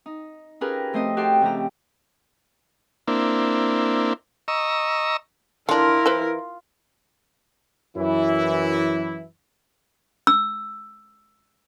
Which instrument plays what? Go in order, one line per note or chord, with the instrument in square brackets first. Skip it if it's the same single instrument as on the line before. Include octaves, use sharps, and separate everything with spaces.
[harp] D#4
C#4 F4 G4 G#4 A#4 B4
F3 A3 C4 C5 D#5
F#4 G4 A4 C5 G5 C6
C#3 F3 A3 G4 A#5
[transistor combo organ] A#3 C4 D4 E4
D#5 A#5 C#6 E6
[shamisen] D3 D4 [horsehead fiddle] E4 A#4 [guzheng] F4
[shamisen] E3 B4 C5
[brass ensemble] F#2 E3 E4
[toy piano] E6